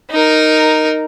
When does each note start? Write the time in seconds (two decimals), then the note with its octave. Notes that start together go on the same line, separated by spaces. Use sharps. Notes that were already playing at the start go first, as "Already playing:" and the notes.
0.11 D#4 A#4